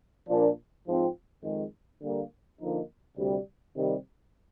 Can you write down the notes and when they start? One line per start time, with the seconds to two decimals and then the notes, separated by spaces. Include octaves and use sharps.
0.28 A#2 F3 A#3 D4
0.85 G#2 F3 C4 F4
1.43 F2 D#3 G#3
2.01 D3 G3 A#3
2.59 D3 F3 A#3 D#4
3.16 D2 C3 G3
3.74 C3 D#3 G3